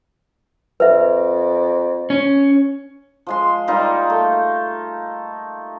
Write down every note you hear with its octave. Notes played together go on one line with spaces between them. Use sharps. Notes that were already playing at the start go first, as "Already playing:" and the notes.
F2 B4 E5
C#4
F3 G#3 C6
G3 A#3 D#4 F4
A3